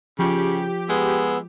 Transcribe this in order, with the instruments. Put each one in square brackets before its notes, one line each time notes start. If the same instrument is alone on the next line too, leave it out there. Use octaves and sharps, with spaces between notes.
[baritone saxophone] C#3 [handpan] F3 F4 [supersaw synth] G4
[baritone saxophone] G#3 [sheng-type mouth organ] B3 E6